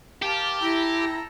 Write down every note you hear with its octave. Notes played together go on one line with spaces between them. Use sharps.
G4 A#4 F5 A5
E4 A4 G5 A#5